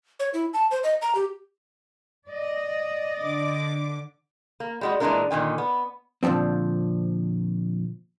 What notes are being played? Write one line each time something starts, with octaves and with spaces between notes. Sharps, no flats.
C#5
E4
A5
C5
D#5
A#5
G4
D5 D#5
D3 D6
A#3
G3 G#3 F#4
A#2 E3 G#3 A#3 D4 A#4
A#2 D3 D#3 G#5
B3
A#2 D3 E3 F3 C4